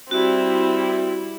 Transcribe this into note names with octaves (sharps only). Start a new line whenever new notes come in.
G3 C4 E4 F#4